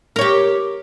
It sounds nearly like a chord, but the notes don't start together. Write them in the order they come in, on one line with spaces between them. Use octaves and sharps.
A#4 C#5 G4